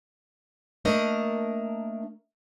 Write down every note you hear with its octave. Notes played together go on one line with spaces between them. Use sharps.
A3 A#3 D4 A#4 D#5